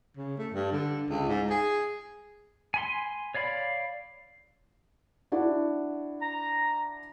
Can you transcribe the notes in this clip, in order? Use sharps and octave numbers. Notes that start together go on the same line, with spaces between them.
C#3
A3
G2
D3
C#2
G#2
G#4
G#5 B5 C6
C#5 D5 F5 B5
D4 E4 F#4
A#5